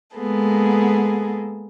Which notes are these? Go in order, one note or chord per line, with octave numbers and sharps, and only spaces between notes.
G#3 A#3 B3 G#4 A4